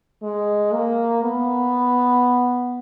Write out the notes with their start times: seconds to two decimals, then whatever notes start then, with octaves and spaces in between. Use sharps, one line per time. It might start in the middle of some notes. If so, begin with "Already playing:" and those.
0.22 G#3
0.73 A#3
1.22 B3